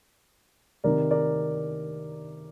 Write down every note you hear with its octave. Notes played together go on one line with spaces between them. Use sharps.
C3 D#3 A#4 D5
A#4 D5